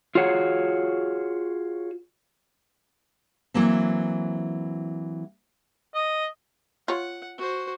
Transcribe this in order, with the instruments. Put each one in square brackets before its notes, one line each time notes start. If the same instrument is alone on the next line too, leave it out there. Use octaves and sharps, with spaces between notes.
[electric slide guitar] F4 F#4 G#4 C#5 F#5
[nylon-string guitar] E3 F#3 A#3 C4
[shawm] D#5
[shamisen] F4 C#5 [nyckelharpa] F#5
[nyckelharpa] F#4 C5